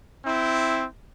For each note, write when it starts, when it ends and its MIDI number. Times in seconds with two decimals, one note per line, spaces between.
0.24 0.85 60
0.24 0.85 64